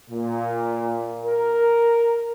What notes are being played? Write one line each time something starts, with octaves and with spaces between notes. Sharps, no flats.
A#2
A#4